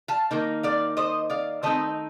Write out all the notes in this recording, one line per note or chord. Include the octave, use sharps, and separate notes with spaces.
F5 A5
D#3 A#3 D#4
D5 F5
C5 D#5
D5 F5
D#3 A3 C4 D#4 C5 D#5